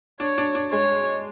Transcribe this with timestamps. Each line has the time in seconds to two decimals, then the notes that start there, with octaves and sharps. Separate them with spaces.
0.20 D4 C#5
0.38 D4
0.55 D4
0.72 G#3 C#5